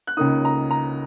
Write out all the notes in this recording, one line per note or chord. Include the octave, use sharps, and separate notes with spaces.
F#6
C#2 C#3 A#3 D#4 D#6
A#5
A#5